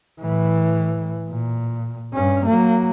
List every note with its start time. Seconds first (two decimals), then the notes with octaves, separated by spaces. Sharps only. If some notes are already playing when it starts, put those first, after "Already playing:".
0.20 A2 E3
1.29 A#2
2.14 G2 C#4
2.46 F#3 A#3